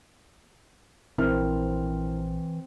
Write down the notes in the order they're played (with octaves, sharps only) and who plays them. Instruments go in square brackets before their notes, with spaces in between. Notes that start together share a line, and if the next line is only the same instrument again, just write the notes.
[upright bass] A#1 [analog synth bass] E3 [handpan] C4 [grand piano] E4 A#4 F6